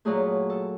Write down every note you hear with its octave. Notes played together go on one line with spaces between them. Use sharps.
A#2 F#3 A3 G#4
A4